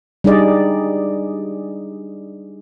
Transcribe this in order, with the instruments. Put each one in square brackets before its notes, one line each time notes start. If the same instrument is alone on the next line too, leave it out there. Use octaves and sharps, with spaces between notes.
[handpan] G3 D4 D#4 G#4 D5 D#5